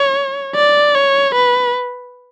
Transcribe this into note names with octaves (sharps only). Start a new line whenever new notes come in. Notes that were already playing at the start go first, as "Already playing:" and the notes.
Already playing: C#5
D5
C#5
B4